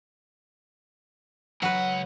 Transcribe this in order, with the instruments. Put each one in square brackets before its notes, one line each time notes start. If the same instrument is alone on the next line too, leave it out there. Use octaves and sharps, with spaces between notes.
[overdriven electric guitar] C#2 F#5 [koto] F#3 B4